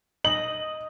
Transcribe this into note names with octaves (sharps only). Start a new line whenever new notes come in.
D#5 F#7